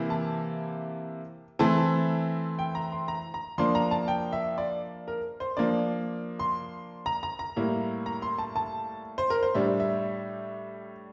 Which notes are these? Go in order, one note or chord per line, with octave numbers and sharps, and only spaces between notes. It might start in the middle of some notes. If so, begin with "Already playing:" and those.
Already playing: C3 E3 A#3 E4
A5
E3 A3 C4 E4 A5
G5
A#5
C6
A#5
A#5
F3 A#3 D4 C6
A#5
A5
G5
E5
D5
A#4
C5
F3 A#3 D4 D5
C6
A#5
A#5
A#5
A2 G3 A#3 E4
A#5
C6
A5
A5
C5
A#4
C5
A2 G3 D4 E5
E5